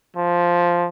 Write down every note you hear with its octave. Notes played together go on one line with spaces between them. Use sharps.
F3